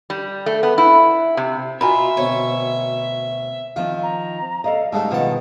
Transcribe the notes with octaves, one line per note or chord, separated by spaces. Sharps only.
G3
A3
B3
E4
C3
B2 F4 E5 G#5 A#5 B5
D2 B2 C4 C#5
D#3 F3 C4 F4
A#5
A4 D5 D#5 F5
G#2 C#3 G3 A3 A5
B2 D#3 F3 F4 F#5 A5